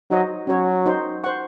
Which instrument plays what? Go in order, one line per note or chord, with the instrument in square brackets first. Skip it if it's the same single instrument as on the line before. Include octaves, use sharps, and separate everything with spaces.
[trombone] F#3 [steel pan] D#4 F#4 C5 D#5
[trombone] F#3 [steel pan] C#4 F#4 C#5
[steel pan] D#4 F#4 C5
C5 F#5 C#6